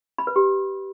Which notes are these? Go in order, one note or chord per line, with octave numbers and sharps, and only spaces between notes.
B5
B4
G4